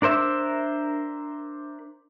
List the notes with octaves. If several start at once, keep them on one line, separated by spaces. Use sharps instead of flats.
D4 A#4 C5 E5